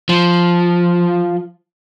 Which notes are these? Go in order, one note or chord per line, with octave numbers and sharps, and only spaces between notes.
F3